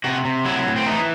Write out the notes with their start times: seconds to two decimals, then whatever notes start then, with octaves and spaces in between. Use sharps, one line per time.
0.04 C3 F#4
0.25 C3
0.45 F#3 E4
0.67 A2
0.76 C4
0.86 E3 D#4